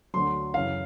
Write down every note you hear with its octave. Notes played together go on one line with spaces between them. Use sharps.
D2 D3 F#3 C6
F#2 C#3 E3 F5